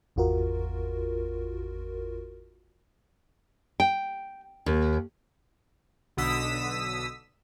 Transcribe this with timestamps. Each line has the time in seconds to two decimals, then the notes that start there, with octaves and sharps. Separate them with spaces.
0.16 G#1 E2 F4 F#4 A#4
3.80 G5
4.66 D#2
6.17 B1 B2 D3 D#6 E6 B6